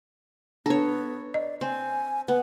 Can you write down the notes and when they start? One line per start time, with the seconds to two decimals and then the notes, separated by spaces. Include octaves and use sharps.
0.66 B3 D4 A4 C#5
1.34 D5 D#5
1.61 C4 G#5
2.28 B3 B4